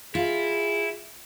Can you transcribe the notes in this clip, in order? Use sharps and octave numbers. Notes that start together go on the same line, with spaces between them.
E4 F4 G#4